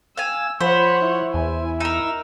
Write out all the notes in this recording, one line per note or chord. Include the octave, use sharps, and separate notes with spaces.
F5 G#5 E6
F3 C5 C#5 F#5 B5
E4
E2 G#5
D#4 A#4 E6